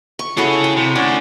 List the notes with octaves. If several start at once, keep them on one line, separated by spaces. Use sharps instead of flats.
C#6
C#4 E4 F#4 G#4 A4
G5
C3
C#4 D4 F#4